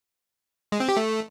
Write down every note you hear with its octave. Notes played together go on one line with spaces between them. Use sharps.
G#3
C4
G4
A3